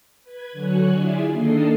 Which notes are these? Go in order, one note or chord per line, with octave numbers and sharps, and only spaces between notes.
B4 G#6
D3 F#3 F#4 C#5 G#5 F#6
E4 F4 G#4 D5 E5 G#5
D#3 A#3 D4 A4 D#5 C7